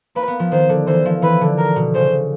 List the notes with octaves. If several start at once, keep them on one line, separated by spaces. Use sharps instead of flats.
A#3 B4
B3
F3
D#3 C5
D3
E3 C5
F3
E3 B4
D3
A#4
B2
C#3 C5